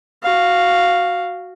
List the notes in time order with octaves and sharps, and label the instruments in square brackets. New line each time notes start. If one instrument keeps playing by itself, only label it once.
[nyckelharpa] F#4 F5